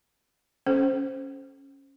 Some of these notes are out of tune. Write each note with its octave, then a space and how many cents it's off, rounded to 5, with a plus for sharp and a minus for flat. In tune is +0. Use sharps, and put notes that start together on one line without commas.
C#4 -10 A4 -30 C5 +0